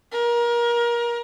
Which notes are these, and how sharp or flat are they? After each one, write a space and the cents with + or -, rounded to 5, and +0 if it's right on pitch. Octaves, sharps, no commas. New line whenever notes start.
A#4 +25